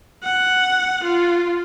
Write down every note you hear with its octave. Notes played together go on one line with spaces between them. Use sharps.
F#5
F4